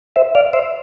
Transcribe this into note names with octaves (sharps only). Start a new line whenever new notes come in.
C5 E5
D5 F5
C5 E5